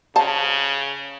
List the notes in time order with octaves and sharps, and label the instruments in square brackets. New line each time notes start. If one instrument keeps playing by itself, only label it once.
[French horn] C#3 [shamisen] C5 A5